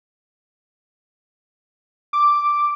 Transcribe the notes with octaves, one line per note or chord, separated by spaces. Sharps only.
D6